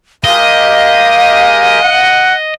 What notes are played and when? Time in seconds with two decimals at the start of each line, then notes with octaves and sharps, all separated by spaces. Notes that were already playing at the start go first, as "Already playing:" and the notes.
0.24 G#3 G4 A#4 D#5 F5
1.82 F#5